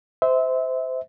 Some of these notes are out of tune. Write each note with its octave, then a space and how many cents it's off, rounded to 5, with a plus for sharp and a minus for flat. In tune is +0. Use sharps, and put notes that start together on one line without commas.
C5 -20 E5 -25